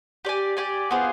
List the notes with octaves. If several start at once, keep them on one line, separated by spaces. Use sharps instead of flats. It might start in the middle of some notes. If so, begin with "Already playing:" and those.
G4 D5 G#5
G4 D5 G#5
B3 F4 G#4 C5